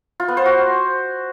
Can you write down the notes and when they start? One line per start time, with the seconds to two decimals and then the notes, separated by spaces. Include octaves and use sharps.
0.20 F4
0.28 B3
0.37 C5
0.46 F#4